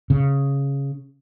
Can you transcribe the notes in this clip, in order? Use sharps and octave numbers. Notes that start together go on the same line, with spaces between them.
C#3